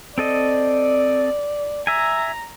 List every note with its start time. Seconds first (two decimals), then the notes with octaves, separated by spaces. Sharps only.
0.18 C4 A4 D5 D#5
1.87 E5 G#5 A#5